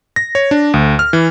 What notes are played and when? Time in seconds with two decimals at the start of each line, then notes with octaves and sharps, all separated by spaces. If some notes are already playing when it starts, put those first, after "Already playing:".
0.16 A#6
0.35 C#5
0.51 D4
0.74 D2
0.99 F6
1.13 E3